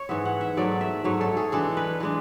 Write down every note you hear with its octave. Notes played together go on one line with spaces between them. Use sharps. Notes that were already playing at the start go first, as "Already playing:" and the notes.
Already playing: C#5
G#2 E3 B3 E5
F#5
E5
G#2 F#3 A3 D5
E5
G#2 F#3 A3 C#5
A4
G#4
E3 G#3 D4 A4
B4
E3 G#3 D4